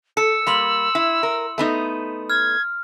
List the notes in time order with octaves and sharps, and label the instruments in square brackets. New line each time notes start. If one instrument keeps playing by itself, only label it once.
[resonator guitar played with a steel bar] A4 [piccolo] E6 [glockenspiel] C#7
[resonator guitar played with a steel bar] G3 A#3 [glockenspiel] B5 C6 F#7
[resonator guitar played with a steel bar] E4
A#4
A3 B3 D#4
[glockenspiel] F6 [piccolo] G#6